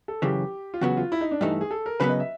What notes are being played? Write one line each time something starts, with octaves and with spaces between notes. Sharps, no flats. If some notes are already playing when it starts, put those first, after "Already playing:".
A4
F#2 C#3 E3 G4
F4
E2 C#3 F#3 B3 F#4
F4
E4
D#4
D4
G2 E3 A3 D#4
G#4
A4
A#4
C#3 F#3 B3 B4
D#5
E5